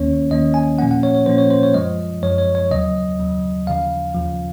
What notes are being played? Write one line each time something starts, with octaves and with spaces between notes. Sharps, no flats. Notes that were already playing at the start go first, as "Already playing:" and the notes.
Already playing: D#2 D#3 A#3 C#4 C#5
D#2 D#3 A#3 C#4 D#5
G#5
A#2 F3 A#3 C#4 F#5
F#5
C#5
C#5
A#2 F3 A#3 C#4 C5
C#5
C5
C#5
F#2 F3 G#3 D#5
F#2 F3 G#3 C#5
C#5
C#5
D#2 C#3 F#3 D#5
D#2 C#3 F#3
D#2 C#3 F3 F5
D#2 C#3 F3